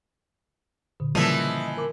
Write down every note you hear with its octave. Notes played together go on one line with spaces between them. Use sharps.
A#2 D3
C#3 E3 F3 G3 A#3 D#5 E5
A#4 D6